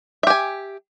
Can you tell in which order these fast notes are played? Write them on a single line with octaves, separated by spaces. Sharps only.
E5 G4 G#5